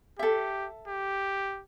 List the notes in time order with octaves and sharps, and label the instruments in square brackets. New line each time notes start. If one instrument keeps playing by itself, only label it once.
[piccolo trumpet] G4 [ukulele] A4 E5
[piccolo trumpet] G4